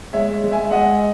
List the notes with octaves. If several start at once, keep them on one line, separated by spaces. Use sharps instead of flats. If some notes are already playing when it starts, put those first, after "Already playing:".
G#3 C#5 E5
G#3
E5 G#5
E5
G#3 D#5 F#5